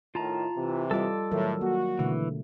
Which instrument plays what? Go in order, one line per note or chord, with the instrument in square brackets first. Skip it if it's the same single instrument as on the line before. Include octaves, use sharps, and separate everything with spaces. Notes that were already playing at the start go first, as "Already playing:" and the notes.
[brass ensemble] A2 D#3 [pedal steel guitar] F4 A5 A#5
[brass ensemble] C3 E3
[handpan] G3 F4 D#5 [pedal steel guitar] A4 D6
[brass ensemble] A2 [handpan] D#3 F#3 A#4
[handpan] A#3 [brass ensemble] F#4
[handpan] B2 D3 A3 [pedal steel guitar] E3